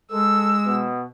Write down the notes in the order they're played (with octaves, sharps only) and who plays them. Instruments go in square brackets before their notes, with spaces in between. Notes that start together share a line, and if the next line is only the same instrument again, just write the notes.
[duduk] G#3 [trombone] A4 [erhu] E6
[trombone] B2